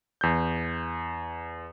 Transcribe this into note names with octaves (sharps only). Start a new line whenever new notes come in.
E2 G6